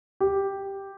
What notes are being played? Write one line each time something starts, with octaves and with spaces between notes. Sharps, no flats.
G4